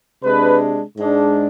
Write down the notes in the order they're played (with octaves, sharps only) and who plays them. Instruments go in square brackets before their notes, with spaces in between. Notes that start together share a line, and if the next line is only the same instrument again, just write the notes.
[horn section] C3 G#3 D4 B4
G#2 G#3 D4